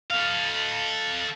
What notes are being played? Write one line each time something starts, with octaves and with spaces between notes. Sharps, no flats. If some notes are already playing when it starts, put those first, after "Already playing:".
A4 F5